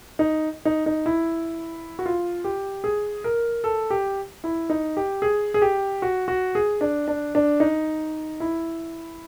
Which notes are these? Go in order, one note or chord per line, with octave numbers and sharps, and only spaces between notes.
D#4
D#4
D#4
E4
F#4
F4
G4
G#4
A#4
A4
G4
E4
D#4
G4
G#4
G#4
G4
F#4
F#4
G#4
D4
D4
D4
D#4
E4